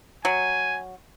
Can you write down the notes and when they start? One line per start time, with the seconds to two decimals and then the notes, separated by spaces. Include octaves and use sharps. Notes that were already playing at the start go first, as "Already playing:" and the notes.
0.25 F#3 G#5